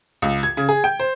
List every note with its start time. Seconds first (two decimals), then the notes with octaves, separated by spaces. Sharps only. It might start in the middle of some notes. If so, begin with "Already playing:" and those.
0.22 C#2
0.43 G#6
0.57 C#3
0.69 G#4
0.84 G5
1.00 C5